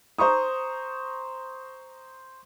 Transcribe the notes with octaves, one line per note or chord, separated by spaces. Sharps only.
C5 A#5 C#6 D#6